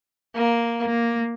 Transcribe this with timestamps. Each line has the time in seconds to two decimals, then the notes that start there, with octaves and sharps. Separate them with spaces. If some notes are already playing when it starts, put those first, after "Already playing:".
0.35 A#3
0.87 A#3